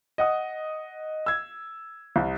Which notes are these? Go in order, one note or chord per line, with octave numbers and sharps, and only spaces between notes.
D#5 F#5 D#6
E6 G#6
C2